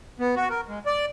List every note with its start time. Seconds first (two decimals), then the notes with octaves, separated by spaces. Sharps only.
0.19 B3
0.36 F#4
0.50 A#4
0.68 G#3
0.86 D5